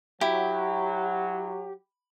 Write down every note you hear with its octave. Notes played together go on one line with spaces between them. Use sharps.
F#3 E4 G4